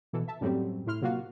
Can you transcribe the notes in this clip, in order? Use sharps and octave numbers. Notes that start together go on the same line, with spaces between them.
B2 E3 A4
E5 A5
F#2 A2 F#3 G3 C4
A2 E4 C6 F6
C3 F#3 A#3 F4 F#4 F5